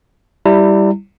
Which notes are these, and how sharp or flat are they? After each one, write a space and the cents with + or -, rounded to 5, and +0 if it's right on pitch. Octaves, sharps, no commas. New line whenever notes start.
G3 +0 E4 +0 A#5 -45